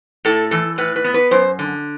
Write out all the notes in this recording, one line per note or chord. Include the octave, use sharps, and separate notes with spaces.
A2 A4
E3 A4
A2 B4
B4
B3
B4
F#2 C5
D3